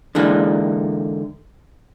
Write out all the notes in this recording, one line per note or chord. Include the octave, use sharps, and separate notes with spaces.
D3 E3 G#3 A#3 D4 D#4